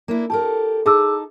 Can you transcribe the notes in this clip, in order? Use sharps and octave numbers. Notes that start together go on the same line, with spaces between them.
A#3 D4 E4
G4 A4 A#4 A5
D#4 G#4 A5 D6 E6